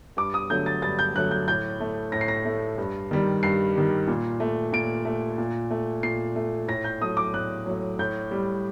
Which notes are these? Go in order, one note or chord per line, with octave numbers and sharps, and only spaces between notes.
G2 D6
D#6
D3 F#3 A3 G6
A6
G2 A6
G6
D3 F#3 A3 F#6
G6
A2 G6
A3
A2 A#6
C7
A#6
A3
G2
D#3 G3
G2 C7
D#3 G3
A#2
A3
A#2 D7
A3
A#2
A3
A#2 C7
A3
A2 A#6
G6
F#3 A3 D#6
D6
A2 F#6
F#3 A3
A2 G6
G3